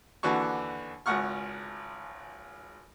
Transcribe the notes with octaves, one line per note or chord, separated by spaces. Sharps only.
D#2 D3 E3 D4 F#4 C#6
G#1 C#2 F#5 C#6 F6